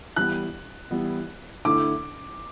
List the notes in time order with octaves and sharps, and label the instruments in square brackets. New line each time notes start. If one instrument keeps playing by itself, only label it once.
[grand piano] E3 G3 B3 E4 [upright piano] F#6
[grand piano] E3 G3 B3 E4
[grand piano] D3 A3 E4 [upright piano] D6